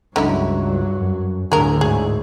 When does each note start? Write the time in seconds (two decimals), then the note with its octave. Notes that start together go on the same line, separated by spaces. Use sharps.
0.16 C#2 G2 D3 F#3 D#4 E4
1.01 F#2
1.52 D2 A2 D3 G#4 A#4
1.81 G#2 G#4